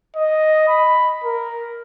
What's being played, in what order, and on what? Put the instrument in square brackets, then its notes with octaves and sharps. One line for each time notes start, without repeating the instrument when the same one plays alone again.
[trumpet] D#5
B5
A#4